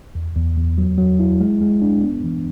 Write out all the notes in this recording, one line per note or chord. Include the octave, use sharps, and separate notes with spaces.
E2
E2
E2
F#3
F#3
E4
G#3
G#3
D4
B3
E3